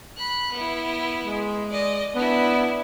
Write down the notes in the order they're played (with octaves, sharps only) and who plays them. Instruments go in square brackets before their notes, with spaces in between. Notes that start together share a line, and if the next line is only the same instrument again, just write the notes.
[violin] B5 F#6
B3 E4
[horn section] G#3
[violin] D5 D#5
[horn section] B3 [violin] D4 E4